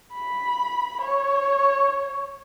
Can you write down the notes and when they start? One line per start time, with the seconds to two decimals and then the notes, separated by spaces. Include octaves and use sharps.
0.13 B5
1.01 C#5